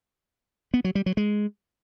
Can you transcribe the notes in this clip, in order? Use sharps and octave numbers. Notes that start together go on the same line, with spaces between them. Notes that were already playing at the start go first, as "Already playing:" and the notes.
B3
F#3
G3
F#3
G#3